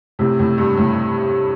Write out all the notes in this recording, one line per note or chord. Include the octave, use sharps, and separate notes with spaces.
A2 C3
A2
G2
A2